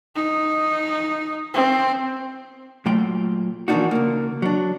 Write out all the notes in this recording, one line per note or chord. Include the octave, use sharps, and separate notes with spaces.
D#4
C4
A#2 F#3 A3 F4 G5
E3 F3 A#3 D4 D#4 F#4
C#2 A#3
F#3 D4